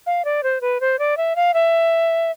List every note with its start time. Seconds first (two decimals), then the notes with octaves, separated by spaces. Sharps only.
0.06 F5
0.25 D5
0.43 C5
0.61 B4
0.81 C5
0.99 D5
1.17 E5
1.36 F5
1.54 E5